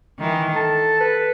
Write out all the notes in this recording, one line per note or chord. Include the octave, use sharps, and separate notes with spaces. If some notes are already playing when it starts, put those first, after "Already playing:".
D#3 E3
A4 A5
B4